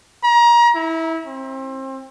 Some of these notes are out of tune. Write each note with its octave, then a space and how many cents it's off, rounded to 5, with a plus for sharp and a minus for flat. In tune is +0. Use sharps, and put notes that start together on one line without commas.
A#5 +30
E4 -20
C4 +30